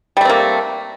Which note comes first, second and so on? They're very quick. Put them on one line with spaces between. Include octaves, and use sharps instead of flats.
G3 A3 C4 A#3